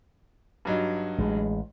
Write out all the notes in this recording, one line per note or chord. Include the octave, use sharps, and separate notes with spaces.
G2 F#3 D#4
A1 G#3